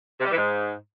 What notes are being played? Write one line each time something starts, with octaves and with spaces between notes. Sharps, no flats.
C3
G3
E3
G#2